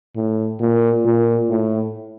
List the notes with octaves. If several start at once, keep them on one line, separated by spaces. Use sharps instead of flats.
A2
A#2
A#2
A2